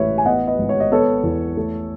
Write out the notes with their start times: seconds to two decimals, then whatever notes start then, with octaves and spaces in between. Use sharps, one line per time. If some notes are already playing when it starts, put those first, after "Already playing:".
Already playing: A1 G#3 B4 C#5 E5
0.18 G#5
0.26 B3 D#5 F#5
0.47 B4 D#5
0.59 G#1
0.69 C#5
0.80 D#5
0.92 B3 A4 C#5
1.23 E2
1.57 A3